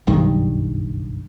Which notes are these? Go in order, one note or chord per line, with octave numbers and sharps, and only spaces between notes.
F#1 B1 G2 D#3